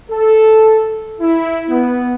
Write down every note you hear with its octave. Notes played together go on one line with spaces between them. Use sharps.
A4
E4
B3